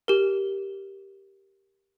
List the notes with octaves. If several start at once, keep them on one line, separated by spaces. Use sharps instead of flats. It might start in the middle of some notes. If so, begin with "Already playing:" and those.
G4 A#4